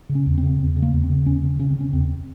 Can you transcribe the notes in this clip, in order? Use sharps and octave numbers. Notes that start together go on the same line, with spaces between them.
C#3
C#4
E2
C4
C#3
E2
C#3
A#3
E2
C4
C#3
E2 C#4
C#3
C#3 C#4
C4
C#3 C#4
E2 C4